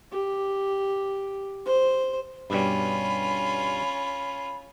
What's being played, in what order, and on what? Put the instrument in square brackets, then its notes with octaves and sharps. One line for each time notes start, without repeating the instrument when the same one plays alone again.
[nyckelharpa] G4
C5
[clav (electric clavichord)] G2 B2 G3 [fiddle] C#4 F4 [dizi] B5